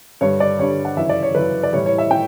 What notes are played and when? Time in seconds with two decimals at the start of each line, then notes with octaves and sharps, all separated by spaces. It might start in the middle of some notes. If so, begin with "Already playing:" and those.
0.21 G2 D3 G3 C#5
0.40 D5
0.59 G2 D3 G3 C#5
0.85 F#5
0.97 F#2 C#3 E3 E5
1.09 D5
1.23 C#5
1.35 F#2 C#3 E3 B4
1.63 D5
1.73 A2 E3 G3 C#5
1.86 C#5
1.98 E5
2.11 A2 G5